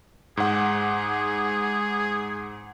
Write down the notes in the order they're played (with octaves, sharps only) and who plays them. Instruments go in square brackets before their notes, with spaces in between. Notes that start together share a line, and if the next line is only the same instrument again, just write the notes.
[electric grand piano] G#2 F#5 [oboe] G#4